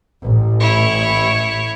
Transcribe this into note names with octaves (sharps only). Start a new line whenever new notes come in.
A1
E4 C#5